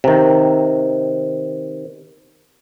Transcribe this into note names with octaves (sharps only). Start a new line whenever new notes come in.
C3 D#3